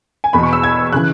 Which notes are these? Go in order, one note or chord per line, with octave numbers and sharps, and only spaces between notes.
G#5
E2 B2 B5
C#6
E6
G#6
C#3 E3 F#6